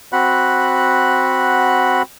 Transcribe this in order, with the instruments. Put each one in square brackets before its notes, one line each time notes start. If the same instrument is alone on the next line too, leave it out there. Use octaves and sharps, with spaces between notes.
[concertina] C4 F#4 F#5 B5 F#6